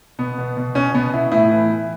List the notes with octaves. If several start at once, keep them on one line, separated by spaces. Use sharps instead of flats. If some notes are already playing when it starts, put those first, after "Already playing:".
B2 B3
B2
B2
B2 C#4
B2 B3
B2 E4
A2 E4
E3
E3